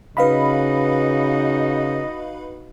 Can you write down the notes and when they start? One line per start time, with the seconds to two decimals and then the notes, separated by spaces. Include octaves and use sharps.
0.17 C#3 D#4 F#4 B4 D#5 F5 B5